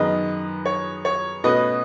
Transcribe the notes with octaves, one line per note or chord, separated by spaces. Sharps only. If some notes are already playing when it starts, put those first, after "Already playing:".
Already playing: F#2 D#3 G#3 B3 D#4 B4 D#5
C#5
C#5
B2 A3 C#4 B4 D#5